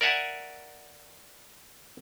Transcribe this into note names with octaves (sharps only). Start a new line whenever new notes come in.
A#4 D5 E5 F#5 G#5